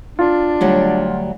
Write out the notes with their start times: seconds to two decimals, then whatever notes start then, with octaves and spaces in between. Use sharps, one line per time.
0.19 D4 F4
0.61 D2 F#3 G3